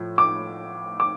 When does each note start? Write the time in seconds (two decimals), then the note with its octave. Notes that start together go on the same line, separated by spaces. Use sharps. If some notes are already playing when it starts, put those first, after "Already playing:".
Already playing: A2 F3
0.18 D6
1.00 D6